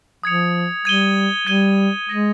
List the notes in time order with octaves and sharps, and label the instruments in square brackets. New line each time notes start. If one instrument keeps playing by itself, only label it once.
[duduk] F3 [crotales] D#6 G#6 C#7 F7
[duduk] G3 [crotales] G#6 D#7 G7
[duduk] G3 [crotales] G#6 D#7 G7
[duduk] G#3 [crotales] D#6 A#6 D#7 G7